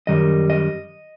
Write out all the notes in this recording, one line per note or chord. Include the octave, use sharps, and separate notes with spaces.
F#2 D#3 G3 D#5
D#5